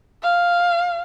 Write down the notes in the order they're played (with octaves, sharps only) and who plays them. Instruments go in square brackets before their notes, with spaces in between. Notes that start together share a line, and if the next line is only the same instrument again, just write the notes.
[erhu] F5